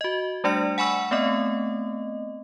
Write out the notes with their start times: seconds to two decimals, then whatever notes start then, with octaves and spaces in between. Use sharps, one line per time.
0.01 F#4 D#5
0.44 G3 A3 D4 D5 C#7
0.78 F#5 G#5 B5 C#6 E6
1.11 A3 B3 C4 D#5